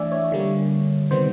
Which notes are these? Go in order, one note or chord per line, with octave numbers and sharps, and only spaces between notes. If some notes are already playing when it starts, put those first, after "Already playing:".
Already playing: E3 A3 D4 D5 E5 G#5
C#5
D3 G3 A#3
C3 D#3 G3 B3 C5